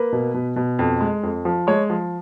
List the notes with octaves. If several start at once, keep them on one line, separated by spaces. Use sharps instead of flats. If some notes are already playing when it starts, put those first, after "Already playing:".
Already playing: A#3 B4
B2
B2
B2
F2
G#3
F2
F3
G#3 C#5
F3